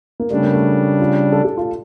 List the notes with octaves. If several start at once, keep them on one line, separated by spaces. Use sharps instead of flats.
A#3
C#3 G3 A3 D4
A#3
A3
F4
A4
G4
F4